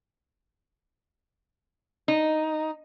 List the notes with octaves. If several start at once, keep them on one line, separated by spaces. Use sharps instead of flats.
D#4